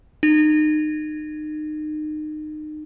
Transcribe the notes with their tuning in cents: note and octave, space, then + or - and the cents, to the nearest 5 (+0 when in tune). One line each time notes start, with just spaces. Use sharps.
D#4 -30